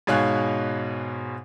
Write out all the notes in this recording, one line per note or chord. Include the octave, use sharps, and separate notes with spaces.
G#2 B2 C#5 F5 G#5 F#6